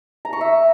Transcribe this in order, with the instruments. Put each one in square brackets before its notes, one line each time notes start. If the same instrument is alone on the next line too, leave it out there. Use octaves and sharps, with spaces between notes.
[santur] A#5
C#6
E5